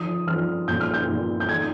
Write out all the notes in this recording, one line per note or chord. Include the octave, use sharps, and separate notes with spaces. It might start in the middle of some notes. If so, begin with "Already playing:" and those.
Already playing: F3 D#6
F3 F6
A#2 G6
F6
G6
A#2
G6
D#3 G#6